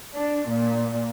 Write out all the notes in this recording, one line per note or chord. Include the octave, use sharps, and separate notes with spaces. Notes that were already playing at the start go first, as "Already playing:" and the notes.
D4
A#2